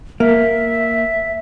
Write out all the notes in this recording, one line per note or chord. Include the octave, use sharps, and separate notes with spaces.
A#3 E5